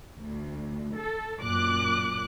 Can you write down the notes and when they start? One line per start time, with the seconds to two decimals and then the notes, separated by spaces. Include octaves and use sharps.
0.17 D2
0.96 A4
1.39 F#2 A#2 D6 F#6